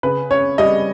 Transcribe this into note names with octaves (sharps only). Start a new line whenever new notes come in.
C#3 B4
C#4 C#5
G3 D#5